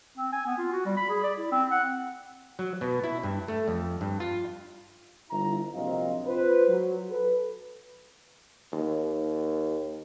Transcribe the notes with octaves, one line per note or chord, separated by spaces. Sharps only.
C4
G#5
B3
F4
F#4
G3
B5
G#4
D5
E4
C4
F#5
F#3
B2
E4
G2
A3
F2
G2
F4
G1 E4 A#5
A#1 C3 F#3 C4 D#5 F5
F4 B4 C5
F#3
A4 B4
D#2